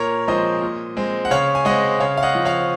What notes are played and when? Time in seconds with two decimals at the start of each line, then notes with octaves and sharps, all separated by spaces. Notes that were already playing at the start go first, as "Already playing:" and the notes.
Already playing: A#2 A#4 C#5
0.28 F3 G#3 C4 C5 D#5
0.62 A#2
0.97 G#3 C4
1.25 F#5
1.31 C#3 C#5 F5
1.55 G#5
1.65 G#3 C4 D#5 F#5
2.00 C#3 C#5 F5
2.17 F5
2.23 D#5 F#5
2.35 F3 C4
2.45 C#5 F5